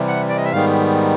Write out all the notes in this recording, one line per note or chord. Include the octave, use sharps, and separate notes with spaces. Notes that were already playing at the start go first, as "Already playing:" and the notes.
Already playing: C3 E3 G3
F#5
D5
D#5
E5
G#2 D#3 G3 B3 F5